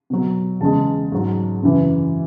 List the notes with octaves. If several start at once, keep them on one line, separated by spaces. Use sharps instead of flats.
B2 F#3
E2 C#3 G#3 A5
G#2 F#3
F#2 C#3 E3